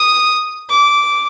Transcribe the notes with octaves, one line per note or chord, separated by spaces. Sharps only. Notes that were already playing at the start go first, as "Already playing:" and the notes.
Already playing: D#6
D6